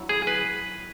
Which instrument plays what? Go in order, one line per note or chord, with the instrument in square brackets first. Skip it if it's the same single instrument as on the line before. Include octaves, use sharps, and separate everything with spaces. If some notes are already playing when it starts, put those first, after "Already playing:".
Already playing: [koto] F#3 E4
[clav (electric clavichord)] G#4
B4